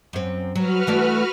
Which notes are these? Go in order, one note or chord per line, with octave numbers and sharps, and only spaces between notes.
F#2 C4
F#3 F#4 B4 F6
E3 A3 D5